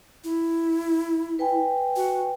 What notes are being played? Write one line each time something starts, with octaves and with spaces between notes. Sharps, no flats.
E4
B4 G5 G#5
F#4